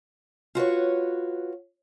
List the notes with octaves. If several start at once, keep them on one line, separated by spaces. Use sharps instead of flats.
F4 F#4 B4 C#5